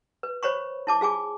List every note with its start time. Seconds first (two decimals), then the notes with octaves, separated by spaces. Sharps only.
0.23 B4
0.43 C5 C#5 B5 C#6
0.87 E4 A5 D6
1.01 F4 G#4 G#5 D6